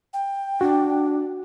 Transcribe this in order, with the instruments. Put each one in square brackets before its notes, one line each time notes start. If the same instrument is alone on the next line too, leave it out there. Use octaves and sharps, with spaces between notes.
[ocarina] G5
[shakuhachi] D4 [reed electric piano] F#4